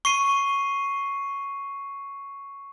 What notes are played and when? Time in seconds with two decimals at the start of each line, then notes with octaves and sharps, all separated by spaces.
0.05 C#6 C7 D#7